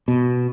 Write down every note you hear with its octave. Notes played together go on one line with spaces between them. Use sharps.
B2